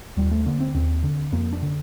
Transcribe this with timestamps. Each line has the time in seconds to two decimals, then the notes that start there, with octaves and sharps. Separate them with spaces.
0.17 D#2 G3
0.32 A3
0.46 D3 A#3
0.60 C4
0.74 D#2 C4
1.03 D3
1.32 F2 A#3
1.53 D4
1.62 D3